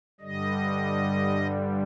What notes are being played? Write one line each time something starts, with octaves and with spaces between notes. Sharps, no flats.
G2 D3 G3 D#5